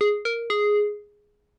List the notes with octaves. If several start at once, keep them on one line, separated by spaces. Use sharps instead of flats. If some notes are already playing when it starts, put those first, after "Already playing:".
G#4
A#4
G#4